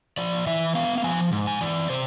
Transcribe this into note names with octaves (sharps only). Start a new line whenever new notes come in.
F3 D5
E3 E5
B3 F5
F5
F3 G#5
G#2
G#5
E3 D5
C3 C5